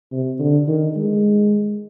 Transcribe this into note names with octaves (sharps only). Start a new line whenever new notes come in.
C3
D3
D#3
G#3